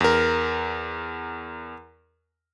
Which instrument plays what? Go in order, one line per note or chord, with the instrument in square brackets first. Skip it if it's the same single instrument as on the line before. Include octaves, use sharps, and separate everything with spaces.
[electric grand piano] E2 A#4